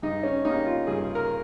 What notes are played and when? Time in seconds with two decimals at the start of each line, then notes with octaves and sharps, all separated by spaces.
0.02 G2 D#4
0.23 C#4
0.45 G3 A#3 D#4
0.66 F4
0.87 G2 G#4
1.15 A#4